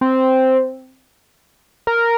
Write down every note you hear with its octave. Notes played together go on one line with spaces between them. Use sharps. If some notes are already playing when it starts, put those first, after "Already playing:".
C4
A#4